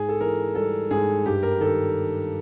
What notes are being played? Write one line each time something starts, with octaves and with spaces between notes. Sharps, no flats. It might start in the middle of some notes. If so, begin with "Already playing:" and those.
Already playing: G#2 G#4
A4
E3 A#4
G3 A4
G#2 G#4
G2 G4
A#4
D#3 A4